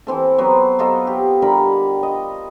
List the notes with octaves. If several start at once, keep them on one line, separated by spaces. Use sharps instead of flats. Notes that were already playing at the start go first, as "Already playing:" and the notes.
E3 C4 A4
F#3 B3 C5
F#3 F4 A4 D#5
G4
D3 G3 A#4 B5
D#5